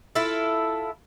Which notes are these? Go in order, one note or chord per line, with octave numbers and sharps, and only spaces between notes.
E4 F4 A4